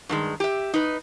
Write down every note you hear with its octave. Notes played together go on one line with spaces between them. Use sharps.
G2 D#3 G#3
G4 E5
D#4 B4